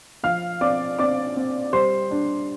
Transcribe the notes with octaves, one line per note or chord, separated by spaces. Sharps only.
F3 F5 F6
C4 D5 D6
C4 D5 D6
C4
G3 C5 C6
D4